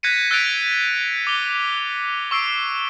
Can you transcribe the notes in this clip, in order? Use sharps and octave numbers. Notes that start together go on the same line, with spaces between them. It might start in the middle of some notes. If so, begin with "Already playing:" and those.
F#6 G#6 A#6 B6 C#7 D#7
E6 F#6 A6 B6 D7 F7
D6 G7
C#6 E6 C7 D7